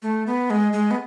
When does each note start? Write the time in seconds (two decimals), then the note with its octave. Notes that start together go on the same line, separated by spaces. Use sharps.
0.02 A3
0.27 B3
0.50 G#3
0.73 G#3
0.91 B3